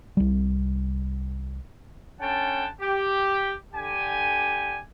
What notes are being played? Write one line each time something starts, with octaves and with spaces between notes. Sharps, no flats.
C2 G3
D3 C#4 F#5 G5 A5
G4
D3 G4 G#5